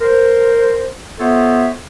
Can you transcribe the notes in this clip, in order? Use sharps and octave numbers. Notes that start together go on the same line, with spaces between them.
A#4 C5
B3 F4 A4 C5 C#5 E5